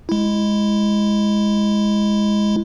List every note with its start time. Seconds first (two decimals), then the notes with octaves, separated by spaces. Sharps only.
0.09 G#3 E4